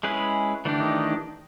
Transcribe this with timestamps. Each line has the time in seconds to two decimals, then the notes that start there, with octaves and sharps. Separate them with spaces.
0.03 G#3 C#4 E4 G#4 B4
0.65 D3 E3 A3 D4 G4
0.80 D#3